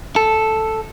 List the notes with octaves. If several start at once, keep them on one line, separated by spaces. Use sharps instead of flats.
A4